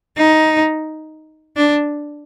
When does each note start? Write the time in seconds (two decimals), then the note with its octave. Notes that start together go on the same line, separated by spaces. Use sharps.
0.17 D#4
1.57 D4